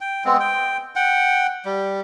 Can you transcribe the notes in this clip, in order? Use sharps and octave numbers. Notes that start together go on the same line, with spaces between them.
G5
G#3 B3 C4
G5
F#5 G5
G3